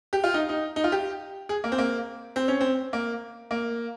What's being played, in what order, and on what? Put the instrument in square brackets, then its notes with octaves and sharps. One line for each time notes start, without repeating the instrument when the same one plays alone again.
[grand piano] G4
F4
D#4
D#4
D#4
F4
G4
G#4
A#3
C4
A#3
C4
C#4
C4
A#3
A#3